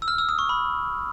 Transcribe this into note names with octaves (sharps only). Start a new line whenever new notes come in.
E6
F6
E6
D#6
C#6
B5